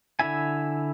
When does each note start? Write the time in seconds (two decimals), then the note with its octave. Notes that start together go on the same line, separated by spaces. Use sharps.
0.19 D3 E4 E5 G#5